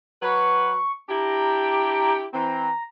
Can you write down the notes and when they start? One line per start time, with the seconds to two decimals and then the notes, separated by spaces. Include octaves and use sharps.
0.22 F#3 F#4 B4 C#6
1.09 D4 E4 G4 A#5
2.33 E3 C4 A#5